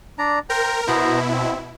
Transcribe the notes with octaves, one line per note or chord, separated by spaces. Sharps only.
D4 D5 A#5
A#4 C5 G5 A#5
B2 B3 E4 C5 A#5
C4